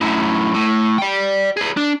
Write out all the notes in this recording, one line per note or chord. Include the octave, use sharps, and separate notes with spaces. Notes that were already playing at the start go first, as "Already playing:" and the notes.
F#2 A2
A2
D5 G5
G#4 B4
D4